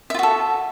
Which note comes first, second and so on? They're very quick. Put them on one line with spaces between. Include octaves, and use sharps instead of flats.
E5 F4 F#4 A4